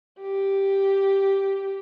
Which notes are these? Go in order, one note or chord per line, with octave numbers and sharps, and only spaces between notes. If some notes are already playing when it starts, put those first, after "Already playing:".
G4